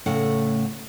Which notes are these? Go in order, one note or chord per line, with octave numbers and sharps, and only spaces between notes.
A2 C#3 A3 F#5